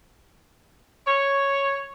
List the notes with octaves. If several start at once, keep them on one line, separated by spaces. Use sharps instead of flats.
C#5